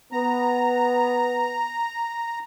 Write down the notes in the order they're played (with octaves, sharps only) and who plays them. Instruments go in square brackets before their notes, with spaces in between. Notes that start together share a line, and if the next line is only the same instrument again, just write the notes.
[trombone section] B3 [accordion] A#5